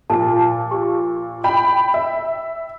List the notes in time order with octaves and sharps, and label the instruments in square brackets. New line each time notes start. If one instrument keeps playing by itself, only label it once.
[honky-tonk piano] A#2 F3 [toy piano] A5
[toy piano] G4
[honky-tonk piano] G5 B5
E5